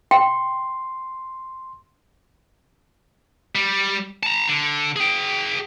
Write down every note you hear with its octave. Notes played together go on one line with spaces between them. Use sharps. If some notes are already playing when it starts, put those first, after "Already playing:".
G5 C6
G3
A5 A#5
D3
G#4 G5